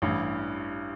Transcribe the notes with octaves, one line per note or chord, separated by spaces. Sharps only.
A1 G2 E3